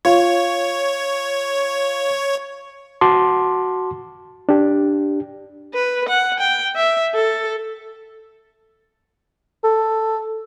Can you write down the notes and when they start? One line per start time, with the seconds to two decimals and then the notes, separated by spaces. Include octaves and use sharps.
0.05 F4 C#5
3.01 F#4 A5 C6 D6
4.49 D4 G4
5.74 B4
6.09 F#5
6.40 G5
6.76 E5
7.15 A4
9.64 A4